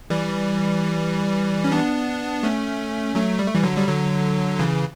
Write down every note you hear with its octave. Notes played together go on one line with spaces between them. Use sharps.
E3 G3
C#4
B3 D4
A3 C#4
F#3 A3
G3
A3
E3 G3
D3 F#3
G3
D3 F#3
C#3 E3